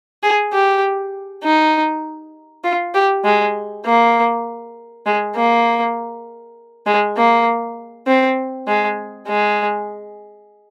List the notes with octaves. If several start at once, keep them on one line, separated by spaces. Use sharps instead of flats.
G#4
G4
D#4
F4
G4
G#3
A#3
G#3
A#3
G#3
A#3
C4
G#3
G#3